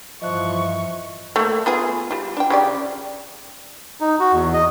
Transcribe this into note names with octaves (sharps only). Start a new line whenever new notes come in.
G2 E3 F3 D#5 E5 C#6 F#6
A3 A#3
B3 F4 G#4
G3 F4
D4 G5
C#3 G4 D5
D#4
F#4
E2
D#5